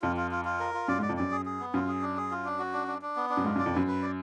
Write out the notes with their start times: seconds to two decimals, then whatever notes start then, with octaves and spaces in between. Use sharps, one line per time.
0.02 F2 F4
0.17 F4
0.31 F4
0.45 F4
0.60 A#4
0.74 F4
0.88 F#2 D5
0.99 G#2
1.02 D5
1.09 F2
1.17 F#2 D5
1.31 G#4
1.46 G#4
1.60 B3
1.74 F#2 F4
1.88 G#4
2.01 D4
2.17 G#4
2.31 F4
2.45 D4
2.59 F#4
2.73 D4
2.88 D4
3.02 D4
3.16 B3
3.30 D4
3.37 F#2
3.44 G#2 F4
3.55 F#2
3.59 D5
3.66 F2
3.73 F#2 B4
3.87 B4
4.02 D5